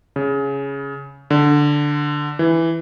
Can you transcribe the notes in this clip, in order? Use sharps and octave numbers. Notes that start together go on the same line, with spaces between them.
C#3
D3
E3